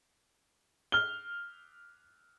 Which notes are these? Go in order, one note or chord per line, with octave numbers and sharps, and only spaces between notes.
F6 G7